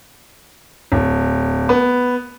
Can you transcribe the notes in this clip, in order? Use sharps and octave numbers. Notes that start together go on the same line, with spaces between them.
D1
B3